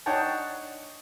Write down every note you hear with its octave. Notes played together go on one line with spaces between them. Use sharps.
D4 D#4 C#5 F#5 G5 A5